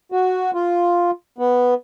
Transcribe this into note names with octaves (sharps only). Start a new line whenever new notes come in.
F#4
F4
B3